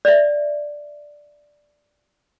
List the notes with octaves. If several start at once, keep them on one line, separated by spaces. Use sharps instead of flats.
D5 E5